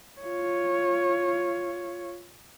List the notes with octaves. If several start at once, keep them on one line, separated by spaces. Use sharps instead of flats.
F4 C#5